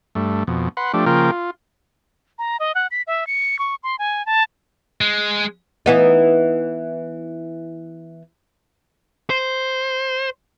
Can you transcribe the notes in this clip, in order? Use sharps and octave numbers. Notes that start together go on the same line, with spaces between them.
G2 A3
F2 B2
B4 F#5 C6
F3 A3 D4 G4
C#3 F3 A#3 F4 A#4 G5
F4
A#5
D#5
F#5
B6
E5
C#7
C#6
C6
G#5
A5
G#3
E3 B3 D#4
C5